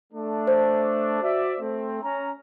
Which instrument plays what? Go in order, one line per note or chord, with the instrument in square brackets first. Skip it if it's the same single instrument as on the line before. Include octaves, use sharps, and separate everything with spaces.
[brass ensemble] A3 D4
[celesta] C5
[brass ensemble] F#4 D5 E5
A3 C4
C#4 A#5